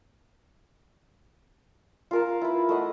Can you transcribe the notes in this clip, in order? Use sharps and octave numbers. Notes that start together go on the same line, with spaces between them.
F4 A#4 A5
E4 B4
A3 D#5 F#5